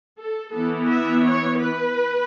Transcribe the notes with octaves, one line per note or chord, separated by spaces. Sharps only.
A4
E3 B3 A4
E5
C#5
B4